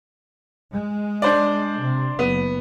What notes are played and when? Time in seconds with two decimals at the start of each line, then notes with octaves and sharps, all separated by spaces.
0.72 G#3
1.22 D4 C5 D5
1.81 C3
2.19 F#1 B3